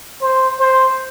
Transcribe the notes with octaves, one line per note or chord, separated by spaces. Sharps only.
C5
C5